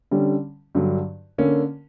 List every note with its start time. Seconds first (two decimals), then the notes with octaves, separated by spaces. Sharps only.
0.11 D3 G3 C#4
0.75 G2 D3 F#3
1.38 D3 A#3 C#4